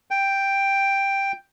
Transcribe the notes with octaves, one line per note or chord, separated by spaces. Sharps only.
G5